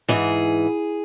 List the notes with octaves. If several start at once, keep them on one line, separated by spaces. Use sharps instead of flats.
G#2 E3 G#4